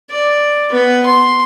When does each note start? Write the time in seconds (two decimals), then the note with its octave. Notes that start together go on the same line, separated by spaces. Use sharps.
0.10 D5
0.71 B3 B4
1.06 C6